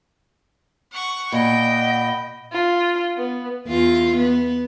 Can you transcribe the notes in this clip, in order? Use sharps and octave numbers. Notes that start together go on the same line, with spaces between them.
F#5 C#6
A#2 D#5 F#5 G5 B5
F4
B3
E2 F4
B3